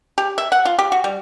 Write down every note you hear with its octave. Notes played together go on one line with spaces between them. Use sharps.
G4
E5
F#5
F4
G4
F#4
G3